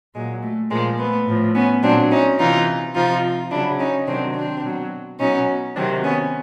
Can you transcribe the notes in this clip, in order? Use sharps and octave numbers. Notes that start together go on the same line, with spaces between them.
A#2 F#3 G#3
A3
A#2 F3 G#3 A#3
A3 B3
A2 F3
B3 C#4
A#2 F#3 C4 D4
C#4 D#4
C3 E3 D#4 F4
C3 F3 D#4 F4
C#3 F#3 D4 E4
C#4 D#4
C3 D#3 F#3 C4 D4
C4 D4
B2 F#3
B2 F#3 C#4 D#4
C3 D#3 F#3 C4 D4
B3 C#4